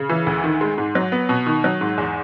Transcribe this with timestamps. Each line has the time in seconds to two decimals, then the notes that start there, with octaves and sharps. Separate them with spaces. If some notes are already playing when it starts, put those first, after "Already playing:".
Already playing: C#3
0.09 E3
0.27 D2
0.44 D#3
0.61 G#3
0.78 G#2
0.95 F#3
1.12 B3
1.29 B2
1.46 D#3
1.64 F#3
1.81 G#2
1.98 E2